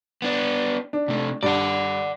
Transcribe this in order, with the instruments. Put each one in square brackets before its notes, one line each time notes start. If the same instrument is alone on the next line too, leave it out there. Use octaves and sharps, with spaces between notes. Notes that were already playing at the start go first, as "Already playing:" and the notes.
[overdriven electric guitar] B3 D4
[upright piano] D4
[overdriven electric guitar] C3 A3
[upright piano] G2 [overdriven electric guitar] D5 F#5